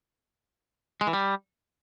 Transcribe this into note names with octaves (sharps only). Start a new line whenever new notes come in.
G#3
E3
G3